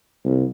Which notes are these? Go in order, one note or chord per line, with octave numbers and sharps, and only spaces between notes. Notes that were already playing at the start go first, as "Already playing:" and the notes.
C2